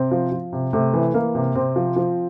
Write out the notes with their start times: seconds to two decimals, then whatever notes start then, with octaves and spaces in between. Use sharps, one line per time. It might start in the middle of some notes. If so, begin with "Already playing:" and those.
Already playing: C3 C4
0.11 F3
0.32 F3
0.53 C3
0.73 C3 A3
0.94 E3
1.14 E3 A#3
1.35 C3
1.55 C3 C4
1.76 F3
1.96 F3